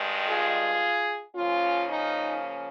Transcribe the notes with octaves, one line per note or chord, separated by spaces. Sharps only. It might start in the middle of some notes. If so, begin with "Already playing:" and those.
Already playing: G2 D#3 G#3
F4 G#4
C#3 F3 A#3 C#4 F4
D#4